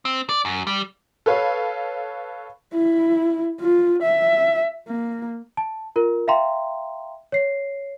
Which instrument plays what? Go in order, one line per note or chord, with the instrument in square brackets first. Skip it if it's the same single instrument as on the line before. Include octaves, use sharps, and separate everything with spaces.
[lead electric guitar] C4
D5
F#2
G3
[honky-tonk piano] A4 B4 C#5 F5
[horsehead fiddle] E4
F4
E5
A#3
[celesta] A5
F4 A#4
E5 F5 G5 A#5 C6
C#5 C7